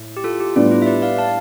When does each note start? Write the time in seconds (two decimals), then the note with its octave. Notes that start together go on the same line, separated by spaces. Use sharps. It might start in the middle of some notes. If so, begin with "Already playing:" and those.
Already playing: A2
0.17 G4
0.24 F4 A4
0.40 G4
0.56 A2 G3 B3 D4 F4
0.71 E4
0.82 E5
0.86 B4 D5
1.02 D5 F5
1.18 F5 A5